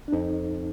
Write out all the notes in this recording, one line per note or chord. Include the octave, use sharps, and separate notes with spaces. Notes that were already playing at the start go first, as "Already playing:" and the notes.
D4
F2 D#4